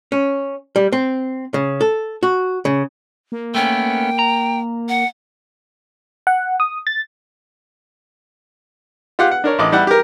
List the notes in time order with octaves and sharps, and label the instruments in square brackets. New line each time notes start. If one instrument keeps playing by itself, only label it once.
[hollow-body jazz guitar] C#4
G3
C4
C#3
A4
F#4
C#3
[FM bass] A#3
[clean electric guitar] A3 B3 C#4 [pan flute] G5
[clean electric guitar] A#5
[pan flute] F#5
[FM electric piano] F#5
D#6
A6
[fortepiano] F4 G4 F#5 F6
F#5
D4 A#4 C#5
A1 D#5 D6
G3 E4 F#5
G4 A#4